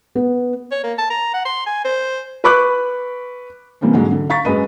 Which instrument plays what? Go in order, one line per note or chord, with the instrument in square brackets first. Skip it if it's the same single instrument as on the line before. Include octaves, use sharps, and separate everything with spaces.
[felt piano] B3
[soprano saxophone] C#5
A#3
A5
A#5
F#5
C6
G#5
C5
[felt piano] B4 B5 C#6 D6 F#6
C3 E3 G3 A#3 C4 C#4
G#2 D3 F#3 G#3
D3
F5 A#5 C#6 A6 B6
F#2 G#3 B4 D#5 B5 D#7